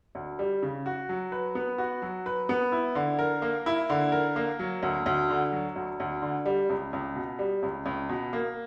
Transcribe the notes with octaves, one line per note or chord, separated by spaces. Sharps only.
D2
G3
C#3
F#4
F#3
B4
B3
F#4
F#3
B4
B3
E4
D3
A#4
A#3
E4
D3
A#4
A#3
F#3
D2
D2
D3
F#3
D2
D2
D3
G3
C#2
C#2
B2
G3
C#2
C#2
B2
A#3